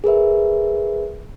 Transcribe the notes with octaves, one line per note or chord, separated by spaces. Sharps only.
G#4 A#4 B4 E5